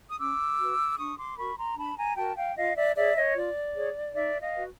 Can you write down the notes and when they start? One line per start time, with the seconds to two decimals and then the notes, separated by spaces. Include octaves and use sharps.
0.08 D#6
0.19 C#4 D6 E6
0.59 F#4 B4
0.98 D4 C#6 D#6
1.18 C6 D6
1.38 F#4 A#4 B5 C#6
1.57 A#5 C6
1.77 D4 A5 B5
1.97 G#5 A#5
2.17 F#4 A#4 G5 A5
2.37 F5 G5
2.57 F4 D#5 F5
2.76 D5 E5
2.96 G#4 C#5 D5 E5
3.16 C#5 D#5
3.36 F4 D5
3.75 G#4 C#5
4.15 D#4 D5 E5
4.41 D#5 F5
4.54 F#4 B4